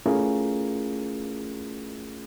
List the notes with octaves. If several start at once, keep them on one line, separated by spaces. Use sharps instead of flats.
A3 C#4 E4 F4 G#4 A#4